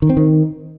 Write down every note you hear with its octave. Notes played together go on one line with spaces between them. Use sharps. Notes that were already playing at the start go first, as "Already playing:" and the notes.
D#3
C4
D#3